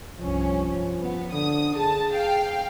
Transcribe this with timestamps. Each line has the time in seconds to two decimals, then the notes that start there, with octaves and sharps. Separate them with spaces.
0.20 C2 G2 F3 C#4
1.00 B3
1.33 D3 D#6
1.76 G#4 A5
2.11 F5 G5